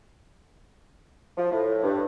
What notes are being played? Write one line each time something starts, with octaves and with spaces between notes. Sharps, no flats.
F3
A2
G2